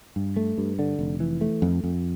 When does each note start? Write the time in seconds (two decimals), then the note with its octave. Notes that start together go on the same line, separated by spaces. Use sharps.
0.16 G2
0.36 A3
0.58 G2
0.79 D3
0.99 F1
1.20 E3
1.41 A3
1.62 F2
1.84 F2